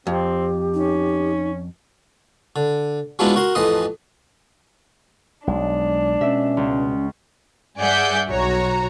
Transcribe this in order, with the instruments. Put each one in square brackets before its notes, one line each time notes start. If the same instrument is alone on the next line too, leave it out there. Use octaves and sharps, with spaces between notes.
[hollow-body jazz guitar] F2 [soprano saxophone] C4 [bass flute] G4
[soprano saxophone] C#4 [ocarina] D#4
[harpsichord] D3
F#3 G#3 B3 D4 E4 F4
F#4 A#4 C6
A1 F2 E3 D#5 C6 D#6
[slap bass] B1 [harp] G#3 [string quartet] D4
[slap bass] B2 [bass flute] C#4 [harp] E5
[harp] C#2
[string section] G2 G#4 D5 E5 F#5 G6
B1 F#4 C#5 A#5